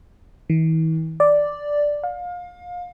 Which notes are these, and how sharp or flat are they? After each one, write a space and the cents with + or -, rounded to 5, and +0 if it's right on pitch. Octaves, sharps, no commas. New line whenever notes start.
E3 -45
D5 +0
F5 +30